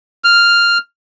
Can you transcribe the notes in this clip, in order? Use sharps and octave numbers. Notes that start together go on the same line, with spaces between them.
F6